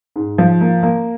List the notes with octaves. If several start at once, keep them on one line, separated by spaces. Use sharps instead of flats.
G#2
F3
A#3
A#3